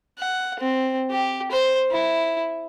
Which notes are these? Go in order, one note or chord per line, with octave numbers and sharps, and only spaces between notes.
F#5
C4
G4
C5
E4